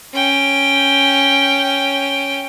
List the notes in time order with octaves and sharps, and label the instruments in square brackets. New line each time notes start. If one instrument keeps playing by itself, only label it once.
[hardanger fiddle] C#4 G5